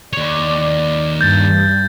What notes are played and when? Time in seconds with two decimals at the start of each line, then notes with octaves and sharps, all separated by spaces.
0.13 D#2 C#5 D5
1.21 G2 G6 A6